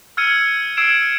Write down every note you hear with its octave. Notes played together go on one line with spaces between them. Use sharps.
E6 F6 G#6 C#7 D#7
E6 G#6 C7 D7 E7